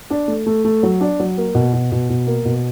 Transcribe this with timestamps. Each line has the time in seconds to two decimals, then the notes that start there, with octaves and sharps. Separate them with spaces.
0.10 D4
0.28 A3
0.46 A3
0.65 A3
0.83 F#3
1.01 D4
1.20 F#3
1.38 A#3
1.55 B2
1.73 B2
1.92 B2
2.10 B2
2.27 A#3
2.45 B2